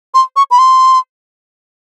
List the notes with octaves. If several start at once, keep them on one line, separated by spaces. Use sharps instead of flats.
C6
C#6
B5
C6